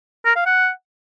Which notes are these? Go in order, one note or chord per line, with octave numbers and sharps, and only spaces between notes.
A#4
F5
F#5